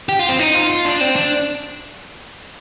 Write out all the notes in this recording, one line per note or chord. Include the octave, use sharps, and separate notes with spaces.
G4
F4
C4
D#4
F4
F4
D4
C4
D4